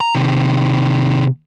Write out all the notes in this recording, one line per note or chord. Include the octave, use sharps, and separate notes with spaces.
A#5
C3 D#3